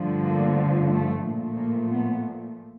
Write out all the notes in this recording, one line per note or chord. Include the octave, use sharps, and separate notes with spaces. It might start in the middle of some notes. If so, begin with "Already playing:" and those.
Already playing: G2 D3 F3 A3
A#3
A3
A#2 F3 A3
A#3
B3